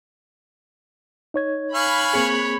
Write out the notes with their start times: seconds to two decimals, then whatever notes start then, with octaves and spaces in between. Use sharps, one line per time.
1.34 D#4 C#5 G#6
1.75 F5 G#5 B5 C#6 F#6
2.13 A#3 C4 G#4 C#5